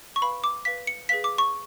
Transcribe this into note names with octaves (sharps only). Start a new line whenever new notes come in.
C#6
B4 F5 B5
D6
B4 F5 B6
C#7
G#4 B4 F5 B6
D6
C#6